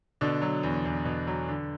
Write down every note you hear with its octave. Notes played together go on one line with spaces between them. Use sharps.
B2 D3 D4
F#3
E2
E2
B2
F#3
D3